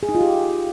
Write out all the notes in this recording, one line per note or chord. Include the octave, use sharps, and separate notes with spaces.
G#4
D#4
F4
G4